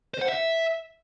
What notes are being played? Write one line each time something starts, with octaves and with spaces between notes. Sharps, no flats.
C5
F#5
E5